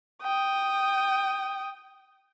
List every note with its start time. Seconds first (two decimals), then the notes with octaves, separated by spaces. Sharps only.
0.23 G5 D#6